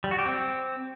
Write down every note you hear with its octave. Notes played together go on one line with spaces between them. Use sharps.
G3
F#4
G4
C4